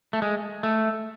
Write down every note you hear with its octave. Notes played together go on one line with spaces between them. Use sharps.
A3
G#3
A3